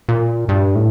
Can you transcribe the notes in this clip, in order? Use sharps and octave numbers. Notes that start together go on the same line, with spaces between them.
A#2
G2
A2